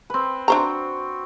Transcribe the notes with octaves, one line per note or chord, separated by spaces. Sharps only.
C4 B4
C4 D4 F#4 C5 A#5